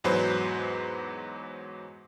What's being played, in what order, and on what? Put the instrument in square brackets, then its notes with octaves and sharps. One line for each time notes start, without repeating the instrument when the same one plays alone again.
[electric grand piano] E2 G#2 F#3 B4 C5 B5